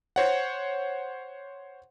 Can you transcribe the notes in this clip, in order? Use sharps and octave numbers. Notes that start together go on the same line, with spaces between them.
C5 C#5 F#5